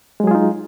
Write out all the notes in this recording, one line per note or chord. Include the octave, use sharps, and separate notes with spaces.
F#3 G#3 D#4 F4 G#4